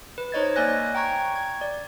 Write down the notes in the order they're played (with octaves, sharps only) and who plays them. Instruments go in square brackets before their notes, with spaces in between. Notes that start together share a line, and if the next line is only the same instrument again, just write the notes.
[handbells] B4
D#4 C5 C#5 D#5 G#6 A6
A#3 D5 G#5 F#6 A#6
G5 A#5 C#6 G#6
G#6
D5